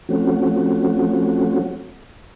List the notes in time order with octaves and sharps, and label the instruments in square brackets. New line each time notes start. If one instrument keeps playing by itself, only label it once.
[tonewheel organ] F3 A3 C4 C#4 F#4